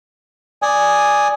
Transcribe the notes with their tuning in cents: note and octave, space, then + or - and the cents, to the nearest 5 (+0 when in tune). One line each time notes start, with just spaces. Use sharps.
D5 +0 G#5 +0 D#6 +0